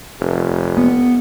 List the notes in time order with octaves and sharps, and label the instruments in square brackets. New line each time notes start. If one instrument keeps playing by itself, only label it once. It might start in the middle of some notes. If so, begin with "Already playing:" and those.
[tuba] F1
[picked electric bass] B3